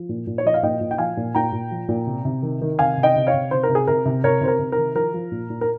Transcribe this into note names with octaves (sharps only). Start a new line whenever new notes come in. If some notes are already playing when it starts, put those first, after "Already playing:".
Already playing: F3
A#2
A#2
C#5
F3 D#5
F5
A#2 D#5 G5
A#2
G5
F3 F5 G#5
A#2
A#2 G5 A#5
A#2
F3
A#2
C3
C3
D#3
D#3
C3 F5 G#5
C3
D#5 G5
C3
C#5 F5
C3
C3 C5
A#4
C3
G#4
C3 A#4
C3
C3 A#4 C#5
C3 C5
A#4
C3
A#4
D#3
F3 A#4
F3
A#2
A#2
A#4